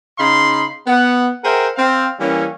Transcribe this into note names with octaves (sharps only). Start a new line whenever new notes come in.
C#3 D#4 F5 B5 C6
B3 F#5
G#4 A#4 C5 E5 F#5 G5
C4 F5
E3 G3 A#3 C#4